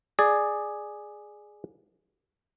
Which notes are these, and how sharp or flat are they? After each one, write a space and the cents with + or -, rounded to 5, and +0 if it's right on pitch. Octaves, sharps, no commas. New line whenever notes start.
G#4 +0 D5 +15